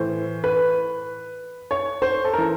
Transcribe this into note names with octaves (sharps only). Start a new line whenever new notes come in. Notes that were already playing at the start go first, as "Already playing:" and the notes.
Already playing: A2 E3 C5
B4
C#5
C5
A4
E3 A#4